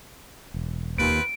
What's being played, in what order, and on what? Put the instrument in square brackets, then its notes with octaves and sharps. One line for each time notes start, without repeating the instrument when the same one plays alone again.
[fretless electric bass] E1
[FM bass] D#2 [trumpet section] C4 F4 B4 [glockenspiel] D7